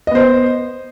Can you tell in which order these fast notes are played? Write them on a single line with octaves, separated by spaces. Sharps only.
D#5 B3 C5